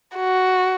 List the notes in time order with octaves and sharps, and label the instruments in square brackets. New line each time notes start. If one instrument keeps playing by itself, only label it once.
[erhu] F#4